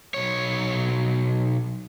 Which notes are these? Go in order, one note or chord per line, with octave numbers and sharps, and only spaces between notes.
B1 C#5